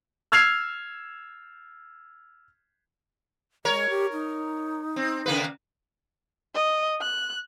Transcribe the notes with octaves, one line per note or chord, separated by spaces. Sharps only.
E6 F6 G#6 C7 F7
G#3 A#4 C#5
G4
D#4
C4
C#3 A#3 B4
D#5
F#6